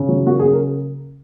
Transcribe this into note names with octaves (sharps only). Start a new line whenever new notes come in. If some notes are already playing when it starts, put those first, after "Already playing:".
Already playing: C#3
F#3
A#3 F#4
G#4
C#3
A#4